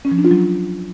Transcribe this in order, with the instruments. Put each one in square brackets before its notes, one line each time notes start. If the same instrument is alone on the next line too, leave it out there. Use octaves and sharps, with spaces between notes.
[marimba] C#4
F3
D4
F4
F#3